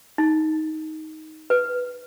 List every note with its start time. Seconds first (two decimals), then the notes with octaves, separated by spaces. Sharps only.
0.18 D#4
1.50 B4